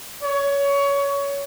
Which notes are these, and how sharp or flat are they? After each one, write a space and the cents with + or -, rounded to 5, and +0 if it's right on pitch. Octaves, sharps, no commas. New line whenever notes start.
C#5 +20